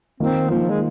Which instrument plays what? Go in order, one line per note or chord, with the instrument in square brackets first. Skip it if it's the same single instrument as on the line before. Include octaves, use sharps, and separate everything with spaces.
[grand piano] D#3 A#3 F4 [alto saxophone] C4
[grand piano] D#3 A#3 F4 [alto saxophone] F3
[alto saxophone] G#3